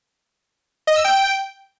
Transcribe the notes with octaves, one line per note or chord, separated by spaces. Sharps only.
D#5
E6
G5